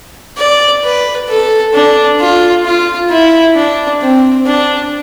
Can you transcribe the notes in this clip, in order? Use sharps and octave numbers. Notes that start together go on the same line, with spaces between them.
D5
B4
A4
D4
F4
F4
E4
D4
C4
D4